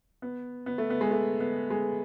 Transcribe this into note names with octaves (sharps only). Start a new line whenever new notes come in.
B3
B3
A3
B3
G#3
A3
B3
G#3